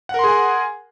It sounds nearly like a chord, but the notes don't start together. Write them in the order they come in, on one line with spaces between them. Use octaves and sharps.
F#5 A#4 C6 G#4 G#5